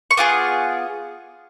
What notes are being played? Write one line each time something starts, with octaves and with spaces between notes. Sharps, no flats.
C#6
B3 F4 G#4 D6